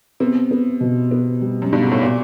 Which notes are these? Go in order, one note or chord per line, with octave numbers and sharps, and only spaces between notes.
C3 B3
B3
B2
B3
G3
F#2
G2 B2
G#2
A2
A#2 B3